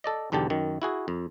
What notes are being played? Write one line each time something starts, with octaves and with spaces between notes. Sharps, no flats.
A4 D5 D#5
B1 E2 D3 G4 A5
F#2 D#3
E4 F#4 G#4
F2